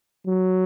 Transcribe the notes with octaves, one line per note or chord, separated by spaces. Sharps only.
F#3